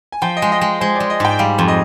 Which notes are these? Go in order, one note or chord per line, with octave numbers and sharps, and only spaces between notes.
G#5
F3 G5
D#5
G#3
D#5
G#3
G#3 C5
G#3 D5
D#5
G#2 G5
G3 F5
F2
D#5